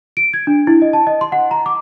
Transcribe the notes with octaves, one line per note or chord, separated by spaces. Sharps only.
D7
G#6
D4
E4
D#5
A5
D#5
C6
F#5
A#5
D6